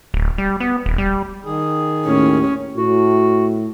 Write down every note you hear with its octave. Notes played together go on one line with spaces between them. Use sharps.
D1
G3
B3
D#1
G3
D#3 G#4
D#2 A2 C#4
A2 F#4